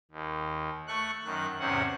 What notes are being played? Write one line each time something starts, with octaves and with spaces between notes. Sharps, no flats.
D#2
A3 C#6 F#6
F#2 D#3 F#6
E2 G#2 C3 C4 C#4 F#5